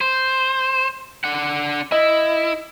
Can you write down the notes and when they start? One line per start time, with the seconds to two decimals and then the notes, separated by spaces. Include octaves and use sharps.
0.01 C5
1.24 D4 F#5
1.92 E4 D#5